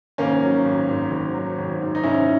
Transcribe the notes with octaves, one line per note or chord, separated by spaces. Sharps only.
G#1 A#3 C#4
F#3
G#1
G#2
G#1
F#3
G#1
G#2
D#4
G#1 C#4 E4